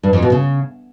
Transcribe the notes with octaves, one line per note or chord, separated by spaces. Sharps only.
G2
F2
B2
C#3